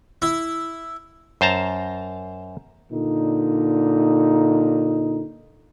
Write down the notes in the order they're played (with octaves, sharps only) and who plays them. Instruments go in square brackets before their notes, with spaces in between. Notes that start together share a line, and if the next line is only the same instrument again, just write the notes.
[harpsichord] E4
[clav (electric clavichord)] F#2 C5 A5 A#5
[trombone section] A#2 D3 D#4